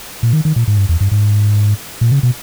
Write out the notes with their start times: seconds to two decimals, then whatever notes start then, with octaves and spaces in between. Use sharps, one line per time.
0.23 A#2
0.33 D#3
0.45 D#3
0.56 A#2
0.67 G#2
0.78 G2
0.89 E2
1.01 G2
1.11 G#2
2.01 A#2
2.12 C#3
2.23 B2